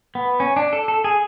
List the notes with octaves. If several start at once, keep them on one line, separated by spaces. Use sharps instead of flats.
B3
C#4
D4
A4
A4
G#4